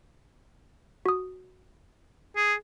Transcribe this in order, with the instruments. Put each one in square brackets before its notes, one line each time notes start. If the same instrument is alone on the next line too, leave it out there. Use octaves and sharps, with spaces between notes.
[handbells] F#4 D#6
[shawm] G#4